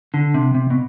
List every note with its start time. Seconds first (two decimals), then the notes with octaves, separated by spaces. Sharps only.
0.14 D3
0.34 C3
0.55 C3
0.70 B2